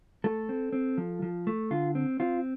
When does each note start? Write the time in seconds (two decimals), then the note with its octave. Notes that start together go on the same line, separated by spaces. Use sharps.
0.24 A3 A4
0.49 C4
0.73 C4
0.98 F3
1.22 F3
1.47 A3
1.71 D3 F4
1.95 C4
2.20 C4 F4